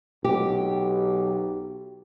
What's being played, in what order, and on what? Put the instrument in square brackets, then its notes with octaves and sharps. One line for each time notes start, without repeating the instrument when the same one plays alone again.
[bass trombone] B1 [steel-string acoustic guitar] G4